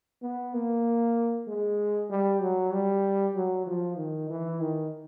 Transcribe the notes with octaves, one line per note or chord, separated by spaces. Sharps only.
B3
A#3
G#3
G3
F#3
G3
F#3
F3
D#3
E3
D#3